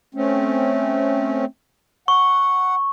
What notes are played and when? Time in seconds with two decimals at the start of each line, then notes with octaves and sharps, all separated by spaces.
0.15 A3 C4 C#4
2.08 F#5 C#6